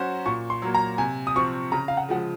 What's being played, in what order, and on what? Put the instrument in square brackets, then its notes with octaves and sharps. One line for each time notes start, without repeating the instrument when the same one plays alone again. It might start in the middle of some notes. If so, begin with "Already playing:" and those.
Already playing: [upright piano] F#3 C#4 F#4 C5
[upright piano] A#2 [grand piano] C#6
[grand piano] C6
[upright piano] F#3 A#3
[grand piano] A#5
[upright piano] C3 [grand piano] G#5
[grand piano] D#6
[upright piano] F3 C4 F4 [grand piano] C#6
[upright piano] C#3 [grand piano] A#5
[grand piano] F5
F#5
[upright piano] F3 G#3 [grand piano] F#5